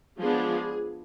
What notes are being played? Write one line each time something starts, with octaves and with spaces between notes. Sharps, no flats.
F3 G#3 B3 D4 G#4